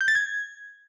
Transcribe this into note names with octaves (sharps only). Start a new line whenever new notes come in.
G6
A6
G#6